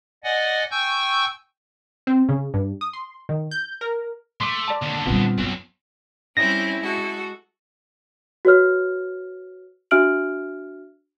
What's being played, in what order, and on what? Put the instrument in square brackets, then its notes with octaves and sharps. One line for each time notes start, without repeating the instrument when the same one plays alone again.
[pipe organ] D5 D#5 F#5 G#5
G5 G#5 C#6 E6 G6
[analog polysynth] C4
C#3
G2
D#6
C6
D#3
G6
A#4
[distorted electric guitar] A3 [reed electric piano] C6 D6
[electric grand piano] D5 A5
[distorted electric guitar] D#2 D3
[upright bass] A#2 G3 [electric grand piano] B3 C4 F4
[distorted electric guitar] B1 [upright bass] F#2
[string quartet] G3 C4 C#4 [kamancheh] E4 [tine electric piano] A#6
[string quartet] G#3 F#4 A4
[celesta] F#4 B4 C#5 F6
D4 F#4 E5 F6 D7 F#7